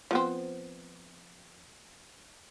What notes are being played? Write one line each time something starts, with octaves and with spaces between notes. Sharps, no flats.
F3 B3 C4